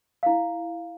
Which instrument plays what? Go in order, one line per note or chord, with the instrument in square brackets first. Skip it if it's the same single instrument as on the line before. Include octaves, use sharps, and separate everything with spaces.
[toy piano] E4 F5